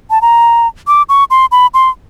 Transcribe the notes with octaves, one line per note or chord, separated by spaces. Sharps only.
A5
A#5
D6
C#6
C6
B5
C6